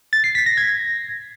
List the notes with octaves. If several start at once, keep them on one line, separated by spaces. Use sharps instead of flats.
A6
C7
B6
A#6
G#6